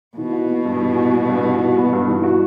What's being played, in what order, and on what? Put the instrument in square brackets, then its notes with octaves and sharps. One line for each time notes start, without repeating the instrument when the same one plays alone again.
[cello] B2 [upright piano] E3
[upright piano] F#4
B3
G2
E3
F#4
B3
G2
E3
F#4
B3
G2
E3
F#4